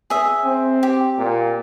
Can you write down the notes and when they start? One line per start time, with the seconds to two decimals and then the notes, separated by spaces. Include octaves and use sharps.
0.10 G#4 E5
0.45 C4
0.83 G4
1.18 A#2